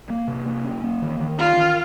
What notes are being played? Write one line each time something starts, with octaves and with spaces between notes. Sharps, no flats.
A#3
C3
A#3
C#4
A#3
D#3
D#3
C#4 F4
D#3